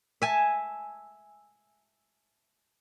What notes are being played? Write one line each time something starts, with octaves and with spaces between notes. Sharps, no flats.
E5 G#5 A5